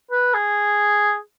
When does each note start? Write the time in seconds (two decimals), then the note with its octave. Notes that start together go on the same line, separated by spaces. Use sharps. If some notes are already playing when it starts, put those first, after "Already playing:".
0.11 B4
0.34 G#4